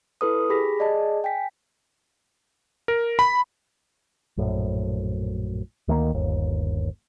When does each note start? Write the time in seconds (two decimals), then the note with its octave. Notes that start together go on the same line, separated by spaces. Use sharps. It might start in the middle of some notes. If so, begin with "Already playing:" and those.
0.21 E4 A4 B4 D#6
0.49 G4 G#4 B5 A#6 B6
0.79 G#4 D5 D#5 A5
1.24 G5 G#5 B6
2.88 A#4
3.19 B5
4.37 A#1 F#2 A2
5.88 D2 D#3 E3 A#3
6.14 G1 D#2